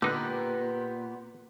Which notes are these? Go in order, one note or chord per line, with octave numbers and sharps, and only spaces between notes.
A#2 D3 B3 D#4 G4 A#4 F#6